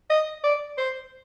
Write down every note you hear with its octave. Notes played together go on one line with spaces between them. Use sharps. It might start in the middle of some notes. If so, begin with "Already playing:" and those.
D#5
D5
C5